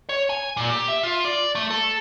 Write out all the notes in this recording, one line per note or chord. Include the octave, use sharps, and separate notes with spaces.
C#5
G#5
A#2
G4
E5
F4
D5
A3
A4